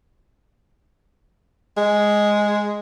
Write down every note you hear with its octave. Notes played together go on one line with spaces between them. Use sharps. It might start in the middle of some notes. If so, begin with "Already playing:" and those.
G#3